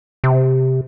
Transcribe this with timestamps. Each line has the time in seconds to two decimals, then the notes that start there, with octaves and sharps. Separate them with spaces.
0.24 C3